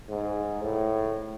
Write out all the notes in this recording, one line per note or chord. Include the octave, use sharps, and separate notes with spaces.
G#2
A2